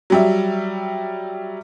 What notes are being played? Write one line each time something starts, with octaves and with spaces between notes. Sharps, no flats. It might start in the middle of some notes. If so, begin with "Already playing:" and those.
F#3 G3 E5